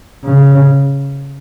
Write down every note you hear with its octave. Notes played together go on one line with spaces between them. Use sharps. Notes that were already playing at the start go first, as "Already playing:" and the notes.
C#3